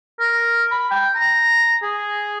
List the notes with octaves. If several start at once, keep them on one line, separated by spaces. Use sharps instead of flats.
A#4
B5
G5
A#5
G#4